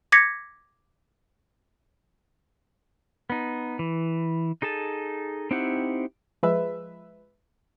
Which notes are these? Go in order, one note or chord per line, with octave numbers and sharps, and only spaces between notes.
D6 G#6 A#6 B6 C#7
B3 D#4
E3
D#4 G#4 A4 A5
C4 D#4 E4 G4 F#5
F3 G#3 B4 E5